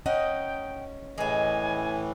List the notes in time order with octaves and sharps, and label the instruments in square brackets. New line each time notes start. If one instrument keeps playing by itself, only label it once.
[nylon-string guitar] C#4 D#5 F#5 [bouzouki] D#4 [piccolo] G5
[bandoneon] A2 E3 [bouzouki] G#3 D#4 [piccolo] G#5